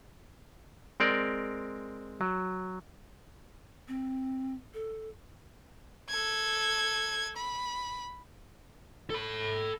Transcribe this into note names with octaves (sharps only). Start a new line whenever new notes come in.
G#3 C4 A#4 D5
F#3
C4
A4
A4 G#6
B5
A4 B5